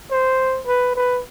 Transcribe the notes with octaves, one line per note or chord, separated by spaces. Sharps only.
C5
B4
B4